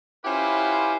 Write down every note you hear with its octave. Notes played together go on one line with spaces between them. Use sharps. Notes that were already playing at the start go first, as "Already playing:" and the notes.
C#4 E4 F4 G4 B4 C5